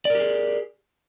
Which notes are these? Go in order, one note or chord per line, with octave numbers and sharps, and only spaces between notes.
G4 G#4 A#4 D5